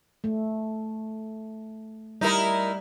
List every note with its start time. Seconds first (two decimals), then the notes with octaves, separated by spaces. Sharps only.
0.24 A3
2.21 G3 D#4 E4 A#4